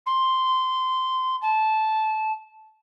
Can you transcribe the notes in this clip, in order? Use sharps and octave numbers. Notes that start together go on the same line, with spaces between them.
C6
A5